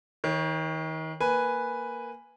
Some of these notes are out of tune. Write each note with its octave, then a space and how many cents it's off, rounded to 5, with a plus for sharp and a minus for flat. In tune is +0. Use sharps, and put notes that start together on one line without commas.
D#3 +35 C#5 -15
A#3 +0 B4 +0 G#5 -5